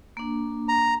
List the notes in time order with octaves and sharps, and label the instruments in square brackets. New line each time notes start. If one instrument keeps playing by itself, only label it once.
[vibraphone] A#3 D4
[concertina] A#5